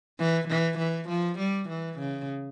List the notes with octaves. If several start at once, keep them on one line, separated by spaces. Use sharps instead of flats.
E3
E3
E3
F3
G3
E3
C#3